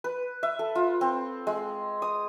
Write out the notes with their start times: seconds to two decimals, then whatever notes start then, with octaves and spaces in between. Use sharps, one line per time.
0.04 B4
0.43 E5
0.59 A4
0.75 F4
1.01 C4
1.47 G#3
2.02 D#6